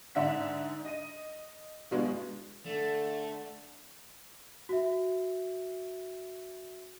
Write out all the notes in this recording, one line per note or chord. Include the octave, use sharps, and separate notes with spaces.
G#2 D3 D4 E5 F#5 B6
D#5 D#7
G2 B2 F#3 G#3 B3 D4
D3 A3
F#4 E5